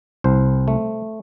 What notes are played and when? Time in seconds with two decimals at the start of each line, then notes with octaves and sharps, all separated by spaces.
0.24 C2 C5
0.68 A3